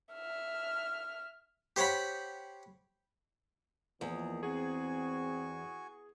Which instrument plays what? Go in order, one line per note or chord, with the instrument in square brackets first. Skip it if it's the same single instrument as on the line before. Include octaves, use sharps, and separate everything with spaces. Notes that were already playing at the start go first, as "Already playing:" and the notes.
[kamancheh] E5 F6
[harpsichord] G4 C5 C#5 F#5 B5
[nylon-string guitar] E2 [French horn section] D#3 F3 A#3 [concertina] G#4
[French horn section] C4 [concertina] F#4 G#5 C#6 [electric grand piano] G#4